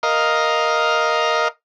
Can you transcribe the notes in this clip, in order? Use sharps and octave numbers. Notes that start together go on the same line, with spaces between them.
A#4 D#5 F5